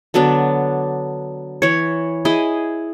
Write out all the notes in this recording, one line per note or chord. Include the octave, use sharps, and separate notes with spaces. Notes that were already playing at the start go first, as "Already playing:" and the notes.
D3 F#3 B3 D4
E3 C#5
E4 G#4 D#5